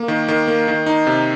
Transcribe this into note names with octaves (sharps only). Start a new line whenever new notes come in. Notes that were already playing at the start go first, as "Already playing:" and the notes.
Already playing: A#3
D#3
D#3
A#3
D#3
D#4
C3